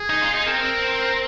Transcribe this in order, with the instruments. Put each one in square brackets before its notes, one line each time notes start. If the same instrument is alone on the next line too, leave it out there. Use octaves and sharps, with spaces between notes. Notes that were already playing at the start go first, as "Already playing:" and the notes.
Already playing: [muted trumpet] G#4
[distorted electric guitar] D#4
F4
D#4
[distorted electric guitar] C4 [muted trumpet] A#4